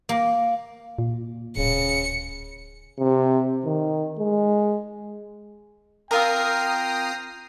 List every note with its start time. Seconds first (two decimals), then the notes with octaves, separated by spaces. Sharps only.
0.09 A#3
0.99 A#2
1.57 D1 C#3 C#7
2.99 C3
3.65 D#3
4.19 G#3
6.11 C4 F4 A#4 G5 A#5 D#6 C7